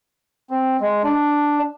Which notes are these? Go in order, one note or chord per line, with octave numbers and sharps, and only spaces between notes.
C4
G#3
D4